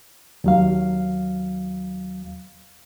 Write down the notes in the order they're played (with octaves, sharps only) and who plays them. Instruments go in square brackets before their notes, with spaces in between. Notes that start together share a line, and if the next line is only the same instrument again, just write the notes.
[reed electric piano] D#2 F#3 F5